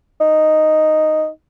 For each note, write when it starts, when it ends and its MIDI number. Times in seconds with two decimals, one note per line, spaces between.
0.20 1.28 63